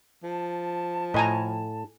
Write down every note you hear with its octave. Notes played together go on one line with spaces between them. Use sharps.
F3 A5
A2 D#5 G#5 A#5